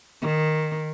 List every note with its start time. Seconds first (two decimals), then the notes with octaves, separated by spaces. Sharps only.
0.22 D#3